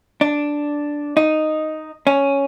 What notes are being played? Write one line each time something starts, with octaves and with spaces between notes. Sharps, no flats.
D4
D#4
C#4